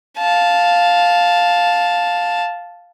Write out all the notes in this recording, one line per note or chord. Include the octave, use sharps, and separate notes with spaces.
F5 A5